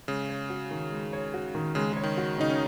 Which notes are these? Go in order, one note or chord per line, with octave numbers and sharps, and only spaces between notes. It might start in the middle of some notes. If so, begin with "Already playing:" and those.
C#3 G#3
C#5
F#4
D#3
G#3
C#5
F#4
D#3
C#3 G#3
C#3
C#5
D#3
F#4
C#3 D#4
C#4